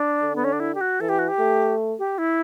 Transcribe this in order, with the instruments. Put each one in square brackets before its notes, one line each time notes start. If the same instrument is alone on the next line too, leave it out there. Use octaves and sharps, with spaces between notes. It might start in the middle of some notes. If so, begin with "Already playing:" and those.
Already playing: [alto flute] D4
[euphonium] D3
[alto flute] B3
C#4
D4
E4
G4
F#4
[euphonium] E3 [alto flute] A4
[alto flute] G4
F#4
G4
[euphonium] A3
[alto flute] G4
E4